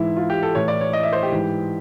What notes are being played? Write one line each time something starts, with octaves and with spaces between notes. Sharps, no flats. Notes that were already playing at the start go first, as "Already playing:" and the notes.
Already playing: G#2 E3 E4
F4
G4
A4
A2 E3 C#5
D5
C#5
D#5
E5
C5
G4
G#2 E3